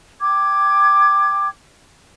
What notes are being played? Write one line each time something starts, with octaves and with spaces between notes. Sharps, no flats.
G5 D6 G#6